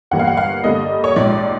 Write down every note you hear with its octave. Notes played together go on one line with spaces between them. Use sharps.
G1 G2 E3 G3 A#3 F#5
F5
F#5
F5
G2 D3 G3 A#3 D#5
C#5
A#1 G#2 F3 D5